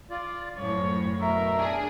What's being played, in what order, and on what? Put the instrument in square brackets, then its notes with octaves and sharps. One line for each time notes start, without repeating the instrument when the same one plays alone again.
[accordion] F4 D5
[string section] F#2 A2 [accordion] F3 [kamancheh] C#5
[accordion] B2 A#4 [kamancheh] E5
[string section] D4 G#4